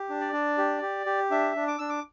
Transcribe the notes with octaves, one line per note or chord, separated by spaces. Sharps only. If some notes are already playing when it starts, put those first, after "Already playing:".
Already playing: G4
D4
D5
D4
G4
G4
G4
D4 E5
D4
D6
D4 E6
D6